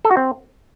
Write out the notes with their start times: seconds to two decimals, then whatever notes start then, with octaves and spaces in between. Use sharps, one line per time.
0.05 A4
0.11 F#4
0.17 C4